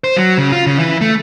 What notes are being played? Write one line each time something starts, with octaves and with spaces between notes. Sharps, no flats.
C5
F#3
C#3
F4
C#3
E3
A3